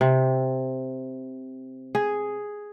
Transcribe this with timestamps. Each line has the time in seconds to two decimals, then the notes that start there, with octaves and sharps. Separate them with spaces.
0.01 C3
1.95 G#4